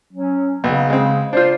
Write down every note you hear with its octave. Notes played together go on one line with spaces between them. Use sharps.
F#3 C#4
B1 C#3
G#3 C4
D4 F4 C5